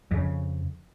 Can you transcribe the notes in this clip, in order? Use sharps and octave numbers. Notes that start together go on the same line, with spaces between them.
F2 C#3